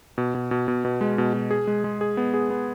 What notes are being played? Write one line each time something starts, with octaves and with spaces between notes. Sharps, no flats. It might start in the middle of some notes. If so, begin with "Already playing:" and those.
B2
B2
B2
B2
B2
G#3
B2
B2
G#4
G#3
G#3
G#4
B3
G#4
B3